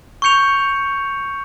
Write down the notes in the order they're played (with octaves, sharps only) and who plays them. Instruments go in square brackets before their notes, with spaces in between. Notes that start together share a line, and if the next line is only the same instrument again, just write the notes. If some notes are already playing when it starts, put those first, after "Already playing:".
[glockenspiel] C#6 G6 C#7 F7